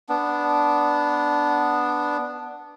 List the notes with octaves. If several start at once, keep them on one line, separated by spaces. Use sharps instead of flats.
B3 D4